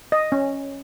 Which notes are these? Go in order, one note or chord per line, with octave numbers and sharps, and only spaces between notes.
D#5
C#4